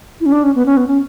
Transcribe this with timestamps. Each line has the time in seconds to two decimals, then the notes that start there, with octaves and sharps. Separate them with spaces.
0.21 E4
0.26 C#4
0.32 D4
0.43 C#4
0.55 B3
0.66 C#4
0.77 B3
0.87 C#4